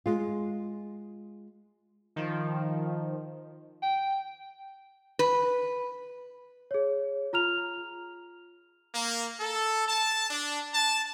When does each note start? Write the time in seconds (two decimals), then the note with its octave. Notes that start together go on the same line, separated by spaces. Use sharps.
0.06 G#3 F4
2.16 D#3 F3
3.83 G5
5.19 B4
6.71 G#4 C#5
7.33 F4 A#5 F6 F7
8.95 A#3
9.40 A4
9.88 A5
10.30 D4
10.74 A5